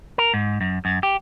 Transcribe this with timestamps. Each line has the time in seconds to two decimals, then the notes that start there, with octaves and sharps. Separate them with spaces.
0.18 A#4
0.34 G#2
0.61 F#2
0.85 F#2
1.03 G4